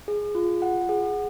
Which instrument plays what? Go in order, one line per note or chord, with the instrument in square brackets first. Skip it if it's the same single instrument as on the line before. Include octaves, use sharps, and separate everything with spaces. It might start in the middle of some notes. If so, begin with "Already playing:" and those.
[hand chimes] G#4
F4
F#5
G#4